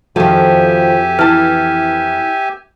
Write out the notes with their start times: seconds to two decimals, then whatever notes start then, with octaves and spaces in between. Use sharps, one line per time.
0.16 F2 D#3 F3 F#4 G4 A4 E5 G#5
1.19 E3 E4 A5 F6